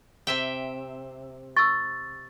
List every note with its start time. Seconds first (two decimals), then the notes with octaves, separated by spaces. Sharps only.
0.27 C3 E5 G5
1.57 C#6 E6 A6